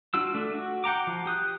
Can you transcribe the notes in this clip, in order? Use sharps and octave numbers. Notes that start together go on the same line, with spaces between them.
D4 F4 F#4 E6
A3 D4
F#4
F#5 G5 A#5 D6
F3
G4 D#6 F#6